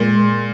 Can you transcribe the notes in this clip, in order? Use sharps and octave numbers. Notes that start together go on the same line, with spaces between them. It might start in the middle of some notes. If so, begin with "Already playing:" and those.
Already playing: A#2 G#3